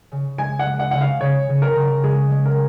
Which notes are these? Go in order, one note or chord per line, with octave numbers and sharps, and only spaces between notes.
C#3
G#3 G#5
F#5
G#3
F#5
C#3 F#5
F5
C#3 C#5
C#3
A#4
C#3
G#3 G#4
G#3
A#4